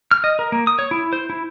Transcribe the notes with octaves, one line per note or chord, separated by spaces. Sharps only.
F6
D#5
A#4
A#3
D#6
C#5
E4
C5
E4